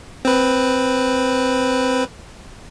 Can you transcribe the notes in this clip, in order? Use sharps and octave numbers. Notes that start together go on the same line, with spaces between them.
C4 B4